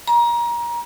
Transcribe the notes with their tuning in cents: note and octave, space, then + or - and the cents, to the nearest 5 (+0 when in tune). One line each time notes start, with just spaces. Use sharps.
A#5 +25